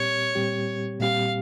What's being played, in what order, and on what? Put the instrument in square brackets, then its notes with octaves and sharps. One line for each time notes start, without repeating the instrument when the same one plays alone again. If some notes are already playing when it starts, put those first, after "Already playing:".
Already playing: [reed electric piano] A#2 G3 C4 G4 [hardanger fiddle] C#5
[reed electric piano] A#2 G3 C4 G4
[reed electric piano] A#2 G3 C4 G4 [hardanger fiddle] F5